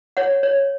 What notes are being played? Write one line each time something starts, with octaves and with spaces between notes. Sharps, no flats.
C#5 F#5
C#5